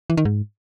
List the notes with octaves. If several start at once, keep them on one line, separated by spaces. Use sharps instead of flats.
E3
D#3
G#2